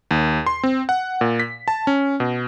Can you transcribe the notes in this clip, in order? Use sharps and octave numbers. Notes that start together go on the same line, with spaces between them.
D#2
C6
C4
F#5
A#2
B6
A5
C#4
B2